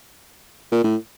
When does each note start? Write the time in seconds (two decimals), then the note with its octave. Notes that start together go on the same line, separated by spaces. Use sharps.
0.72 A#2
0.84 A2